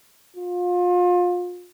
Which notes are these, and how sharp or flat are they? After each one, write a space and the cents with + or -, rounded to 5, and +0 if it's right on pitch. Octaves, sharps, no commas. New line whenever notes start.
F4 +30